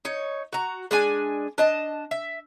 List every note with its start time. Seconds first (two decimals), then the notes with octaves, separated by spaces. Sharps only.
0.05 D#4 C#5
0.53 F#4 A#5
0.91 G#3 D4 G#5
1.58 D4 D#5 A5
2.11 E5